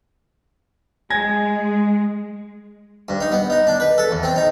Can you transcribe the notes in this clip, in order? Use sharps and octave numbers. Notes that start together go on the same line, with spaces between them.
G#3 G#5 G#6 A#6
G2
D#4
B3
D#4
D4
B4
A4
E2
C4
D#4